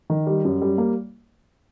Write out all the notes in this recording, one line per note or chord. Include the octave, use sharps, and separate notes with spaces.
D#3
G3
F#2
G3
A#3